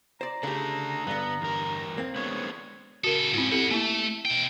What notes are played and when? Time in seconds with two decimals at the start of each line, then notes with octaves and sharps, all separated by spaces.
0.21 C5 D5 A#5
0.43 C#3 A3 D4 G4 A4
1.07 G2 D3 B3
1.41 E2 A#4
1.98 A#3 C4
2.16 G#3 B3 D4 C#5
3.04 C#3 F#4 A4 A#4
3.34 G#2 C4 C#4 E4 F4
3.52 C4 E4 G4 A4 F#5
3.71 A3 A#3 E4
4.25 B2 G5